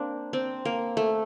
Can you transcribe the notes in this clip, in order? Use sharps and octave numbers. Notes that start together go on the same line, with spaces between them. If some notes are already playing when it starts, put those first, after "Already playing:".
Already playing: A#3 C4 D4
C4
A#3
A3